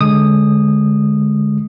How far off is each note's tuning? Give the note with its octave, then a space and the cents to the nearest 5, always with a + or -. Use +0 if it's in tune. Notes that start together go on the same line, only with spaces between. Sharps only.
D3 +0 G#3 +10 D#6 -10